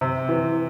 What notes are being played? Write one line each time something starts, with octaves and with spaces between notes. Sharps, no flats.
C3
E3